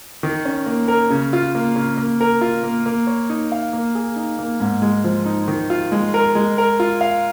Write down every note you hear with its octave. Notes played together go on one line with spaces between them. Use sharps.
D#3
C#4
A#3
A#4
C#3
F4
A#3
C#3
A#3
A#4
F4
A#3
A#3
C#5
D#4
F5
A#3
G#4
D#4
A#3
G#2
G#3
F3
D#4
D#3
F4
G#3
A#4
G#3
A#4
F4
F5